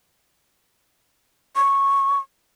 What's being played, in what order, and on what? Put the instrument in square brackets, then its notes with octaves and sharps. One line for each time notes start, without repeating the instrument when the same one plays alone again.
[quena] C#6